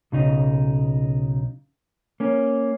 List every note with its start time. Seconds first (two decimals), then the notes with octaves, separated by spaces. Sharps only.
0.12 B1 C#3 D#4
2.20 A#3 C#4